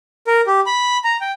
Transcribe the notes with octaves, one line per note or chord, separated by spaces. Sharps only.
A#4
G4
B5
A#5
G5